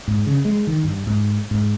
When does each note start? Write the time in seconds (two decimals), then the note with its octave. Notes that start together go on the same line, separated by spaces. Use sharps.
0.08 G#2
0.26 C#3
0.45 G#3
0.67 D#3
0.84 G2
1.07 G#2
1.51 G#2